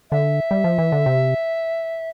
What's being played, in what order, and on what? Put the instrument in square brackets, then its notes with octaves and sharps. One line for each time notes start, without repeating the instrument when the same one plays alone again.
[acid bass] D3 [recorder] E5
[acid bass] G3
F3
E3
D3
C3